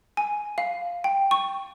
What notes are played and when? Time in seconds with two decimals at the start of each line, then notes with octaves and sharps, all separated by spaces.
0.17 G#5
0.58 F5
1.04 G5
1.31 C#6